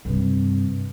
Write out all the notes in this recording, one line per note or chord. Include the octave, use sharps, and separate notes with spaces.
G2 C3